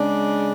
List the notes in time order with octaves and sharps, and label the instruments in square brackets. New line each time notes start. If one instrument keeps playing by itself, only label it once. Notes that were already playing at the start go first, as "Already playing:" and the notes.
Already playing: [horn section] C#3 G#3 D4